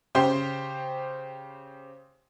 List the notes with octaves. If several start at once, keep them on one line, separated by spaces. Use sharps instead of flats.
C#3 G4 C5 C6